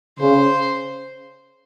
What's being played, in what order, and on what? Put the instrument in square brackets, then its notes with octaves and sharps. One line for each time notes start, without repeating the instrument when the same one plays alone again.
[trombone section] C#3 [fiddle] C5